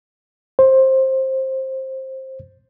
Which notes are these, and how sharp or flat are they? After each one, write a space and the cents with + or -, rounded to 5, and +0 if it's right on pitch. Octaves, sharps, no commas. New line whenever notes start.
C5 +15